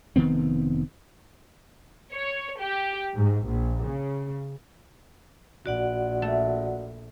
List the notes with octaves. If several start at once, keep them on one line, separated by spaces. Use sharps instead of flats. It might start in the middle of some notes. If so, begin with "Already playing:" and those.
F1 D#3 B3 C4
C#5
G4
G#2
A#1
C#3
A#1 F#4 D5 F#5
A3